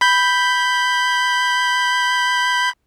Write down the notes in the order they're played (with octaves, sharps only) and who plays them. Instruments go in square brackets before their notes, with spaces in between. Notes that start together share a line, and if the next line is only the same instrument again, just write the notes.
[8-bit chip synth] B5 G6